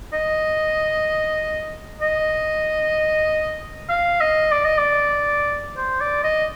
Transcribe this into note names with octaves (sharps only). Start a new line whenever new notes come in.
D#5
D#5
F5
D#5
D5
D#5
D5
C5
D5
D#5